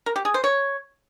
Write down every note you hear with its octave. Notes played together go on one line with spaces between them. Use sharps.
A#4
G4
G#4
C5
C#5